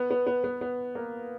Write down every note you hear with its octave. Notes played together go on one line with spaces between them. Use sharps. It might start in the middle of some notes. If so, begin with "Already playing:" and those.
Already playing: B3
B3
B3
B3
B3
A#3